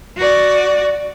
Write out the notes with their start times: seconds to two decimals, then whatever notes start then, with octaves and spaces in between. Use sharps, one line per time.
0.17 F#4 D5